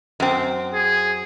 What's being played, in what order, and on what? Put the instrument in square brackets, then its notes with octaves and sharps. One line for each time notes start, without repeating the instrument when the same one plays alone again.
[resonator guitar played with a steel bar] F#2 C4
[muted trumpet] G#4